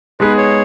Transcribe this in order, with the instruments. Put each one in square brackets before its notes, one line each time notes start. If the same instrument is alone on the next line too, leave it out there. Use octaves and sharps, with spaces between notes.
[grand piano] G#3 B3 D#4 G#4 [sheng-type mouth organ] B4
[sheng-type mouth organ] C#5